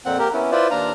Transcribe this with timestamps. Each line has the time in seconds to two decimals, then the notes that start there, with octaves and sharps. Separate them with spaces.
0.05 F2 A#2 C4 F#5
0.19 A#3 G4 A#4
0.34 B3 C#4 E4
0.52 E4 F4 B4 C5 D5
0.71 D#2 D4 F5 A#5